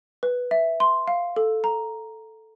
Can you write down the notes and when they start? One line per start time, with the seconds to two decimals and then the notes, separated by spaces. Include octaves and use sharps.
0.23 B4
0.51 E5
0.80 C6
1.08 F5
1.36 A4
1.64 A#5